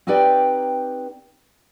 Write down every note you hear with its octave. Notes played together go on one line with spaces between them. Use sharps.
C4 D#4 G4 B4 D5 G5